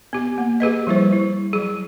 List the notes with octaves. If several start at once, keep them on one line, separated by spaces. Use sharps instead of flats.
B3 G4
A#3
G4 G#4 B4 D#5
F3 G3 E4 C5
E4
F#3 G#4